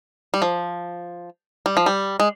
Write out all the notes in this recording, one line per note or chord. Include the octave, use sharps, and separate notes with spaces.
G3
F3
G3
F3
G3
G#3